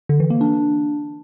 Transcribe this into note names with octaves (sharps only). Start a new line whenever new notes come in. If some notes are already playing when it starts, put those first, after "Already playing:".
D3
E3
A#3
D4